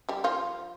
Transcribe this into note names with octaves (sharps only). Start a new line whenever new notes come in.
G3 G4
F3 F4